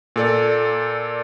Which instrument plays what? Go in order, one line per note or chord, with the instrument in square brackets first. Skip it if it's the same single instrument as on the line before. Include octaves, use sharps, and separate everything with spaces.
[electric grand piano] A#2 A4 D5